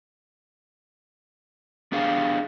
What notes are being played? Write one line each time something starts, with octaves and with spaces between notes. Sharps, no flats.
B3 D4 G4 G#4 F5